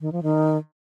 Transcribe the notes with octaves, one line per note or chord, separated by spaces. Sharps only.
D#3
F3
D#3